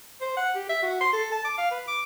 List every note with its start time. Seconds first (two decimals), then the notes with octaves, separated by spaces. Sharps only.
0.21 C5
0.37 F#5
0.55 G4
0.69 E5
0.82 F#4
1.01 C6
1.13 A4
1.32 A5
1.45 D6
1.58 F5
1.71 B4
1.88 D6